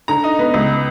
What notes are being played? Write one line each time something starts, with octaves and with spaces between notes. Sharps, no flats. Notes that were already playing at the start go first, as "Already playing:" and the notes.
D3 A#5
D#4
B3
C#2